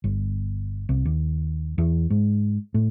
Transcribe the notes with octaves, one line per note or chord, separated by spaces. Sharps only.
G1
C2
D#2
E2
G#2
A2